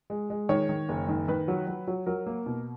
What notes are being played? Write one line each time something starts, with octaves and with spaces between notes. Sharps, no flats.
G#3
G#3
D#3 C#5
D#3
F#1
D#3
D#3 B4
F#3
F#3
F#3
F#3 A#4
A#3
B2